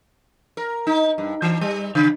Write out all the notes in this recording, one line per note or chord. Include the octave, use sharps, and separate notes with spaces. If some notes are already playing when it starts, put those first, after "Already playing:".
A#4
D#4
G2
E3
G3
C#3